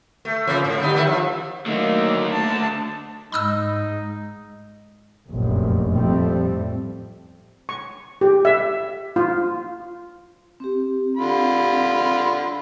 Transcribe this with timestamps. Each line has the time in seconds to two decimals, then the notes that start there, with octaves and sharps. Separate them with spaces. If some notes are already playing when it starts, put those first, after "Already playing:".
0.25 A3
0.47 C#3 F3 A#3
0.64 G#2
0.80 D3 G3 D#4
0.93 D#3 G3 E4
1.07 F3
1.66 D3 D#3 F#3 A3 A#3
2.32 A5
3.32 G#2 D#4 B5 D#6 E6
5.29 F1 A#1 F#2
5.94 F2 A2 G3 A3 C4
7.69 C#6
8.21 G4
8.45 E5
9.16 F4
10.60 C4 G4
11.17 D3 F4 B5